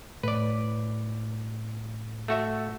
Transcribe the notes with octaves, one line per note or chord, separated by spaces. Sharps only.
A2 B4 D5
A3 F#4 E5